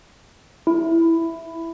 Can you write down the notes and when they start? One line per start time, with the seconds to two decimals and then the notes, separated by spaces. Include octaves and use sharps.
0.67 E4